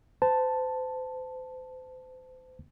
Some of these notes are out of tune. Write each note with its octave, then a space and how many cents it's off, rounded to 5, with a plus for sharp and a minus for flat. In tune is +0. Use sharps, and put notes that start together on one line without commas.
C5 -35 A5 +0